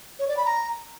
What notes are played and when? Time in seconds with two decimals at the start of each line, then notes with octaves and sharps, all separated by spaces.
0.19 C#5
0.28 D5
0.37 B5
0.46 A#5